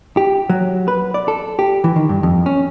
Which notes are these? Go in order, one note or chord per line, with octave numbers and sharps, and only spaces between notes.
G4
F#3
B4
D5
A4
G4
E3
D#3
G2
F2
C#4